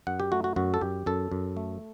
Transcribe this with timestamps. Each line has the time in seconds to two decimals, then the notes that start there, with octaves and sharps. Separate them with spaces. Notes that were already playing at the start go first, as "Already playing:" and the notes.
0.07 F#2 F#5
0.20 G4
0.32 A3 F#4
0.44 F#4
0.56 F#2 F#4
0.74 A4
0.81 F#2 G4
1.06 F#2 A4
1.32 F#2
1.57 A3